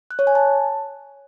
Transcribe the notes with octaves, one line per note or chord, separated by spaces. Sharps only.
F#6
C#5
G#5
A5